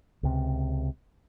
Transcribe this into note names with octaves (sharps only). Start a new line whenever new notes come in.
C#2 C3